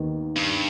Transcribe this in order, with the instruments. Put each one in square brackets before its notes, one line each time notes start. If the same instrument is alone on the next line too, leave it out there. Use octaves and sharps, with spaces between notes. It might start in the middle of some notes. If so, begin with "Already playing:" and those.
Already playing: [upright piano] D#2 D#3 B3
[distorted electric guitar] G2